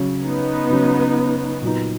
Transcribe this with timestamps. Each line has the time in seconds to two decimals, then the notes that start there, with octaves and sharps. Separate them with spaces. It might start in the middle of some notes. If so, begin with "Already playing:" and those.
Already playing: C#3 F#3 C#4
0.25 B3 D#4
0.70 C#3 F#3 C#4
1.62 A#2 F#3 B3 D#4